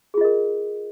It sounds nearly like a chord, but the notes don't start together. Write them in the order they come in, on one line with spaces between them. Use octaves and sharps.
G#4 F4 D#5 A#4